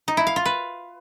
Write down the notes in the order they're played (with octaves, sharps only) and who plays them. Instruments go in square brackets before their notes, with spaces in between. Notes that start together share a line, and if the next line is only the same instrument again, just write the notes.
[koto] D#4
E4
F5
F4
B4